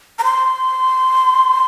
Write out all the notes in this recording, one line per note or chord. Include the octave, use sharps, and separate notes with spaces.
A#5
C6